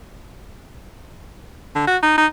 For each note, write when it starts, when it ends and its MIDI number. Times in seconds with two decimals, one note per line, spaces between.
1.75 1.86 50
1.87 1.97 66
2.02 2.14 63
2.17 2.26 63